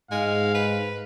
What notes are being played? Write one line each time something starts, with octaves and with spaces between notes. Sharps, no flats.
G#2 G#3 F5
B4